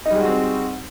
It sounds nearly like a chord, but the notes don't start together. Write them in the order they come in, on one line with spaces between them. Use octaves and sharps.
D#4 G3 G#3 F#4 C4